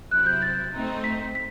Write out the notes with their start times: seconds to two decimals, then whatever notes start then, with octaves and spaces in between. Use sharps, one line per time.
0.11 C3 F#3 C4 E4 F#6
0.26 G6
0.42 A6
0.73 A3 C4 D#4
1.04 B6
1.35 B6